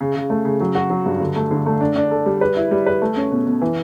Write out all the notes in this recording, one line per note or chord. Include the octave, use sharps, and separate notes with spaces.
C#3
C#3
A3
C#3
F#3
F#4
F#3
G2
D3
A3
D3
A3
D4
D4
A4
G3
B4
E4
G3
B4
A3
C#4
B2
B2
E3